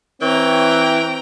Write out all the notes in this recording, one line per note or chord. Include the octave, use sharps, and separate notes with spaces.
E3 C4 C#5 G5 A#5